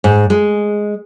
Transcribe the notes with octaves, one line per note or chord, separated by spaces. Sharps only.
G#2
G#3